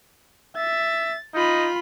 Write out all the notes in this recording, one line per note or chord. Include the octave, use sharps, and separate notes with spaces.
E5 A6
D#4 F4 B5